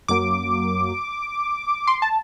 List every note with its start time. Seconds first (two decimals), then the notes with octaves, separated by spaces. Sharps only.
0.08 F#2 F#3 A#3 D6
1.87 C6
2.02 A5